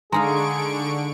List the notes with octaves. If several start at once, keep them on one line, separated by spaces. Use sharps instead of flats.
D3 G#3 D#4 G#4 F5 A#5 C#6 D7